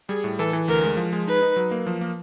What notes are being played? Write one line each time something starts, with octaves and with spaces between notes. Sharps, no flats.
G3 G#4
A2
E3 A4
E3
D2 A#4
G#3
F3
G#3
D#4 B4
D#4
F#3
A#3
F3
A#3